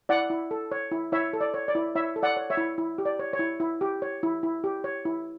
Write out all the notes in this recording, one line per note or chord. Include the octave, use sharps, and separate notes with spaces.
E4 D5 F#5
E4
A4
C#5
E4
E4 C#5 E5
A4
D5
C#5
D5
E4
E4 C#5 E5
A4
D5 F#5
C#5
C#5 E5
E4
E4
G4
D5
C#5
C#5
E4
E4
G4
C#5
E4
E4
G4
C#5
E4